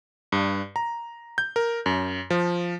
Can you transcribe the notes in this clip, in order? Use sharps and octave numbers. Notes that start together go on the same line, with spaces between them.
G2
A#5
G6
A#4
F#2
F3